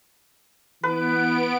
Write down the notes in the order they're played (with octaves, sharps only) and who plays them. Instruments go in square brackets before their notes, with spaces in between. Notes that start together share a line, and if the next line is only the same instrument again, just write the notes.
[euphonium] E3 [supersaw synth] B3 D7 [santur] B4